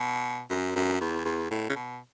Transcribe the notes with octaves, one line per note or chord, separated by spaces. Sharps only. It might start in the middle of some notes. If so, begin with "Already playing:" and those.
Already playing: B2
F#2
F#2
E2
E2
A2
C#3
B2